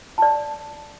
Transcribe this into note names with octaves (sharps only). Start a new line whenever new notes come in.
D5 A5